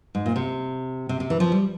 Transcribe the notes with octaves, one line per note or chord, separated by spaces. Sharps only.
G#2
A#2
C3
C3
C3
E3
F3
G3